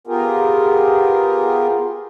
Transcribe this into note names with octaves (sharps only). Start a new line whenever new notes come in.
B3 F4 G4 G#4 A#4